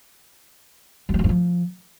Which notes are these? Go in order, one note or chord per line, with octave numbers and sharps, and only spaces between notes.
F#3
G3
F#3
G2
F3